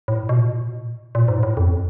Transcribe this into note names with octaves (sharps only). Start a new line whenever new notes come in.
A2
B2
A#2
A2
A#2
A#2
G#2
A#2
A2
F2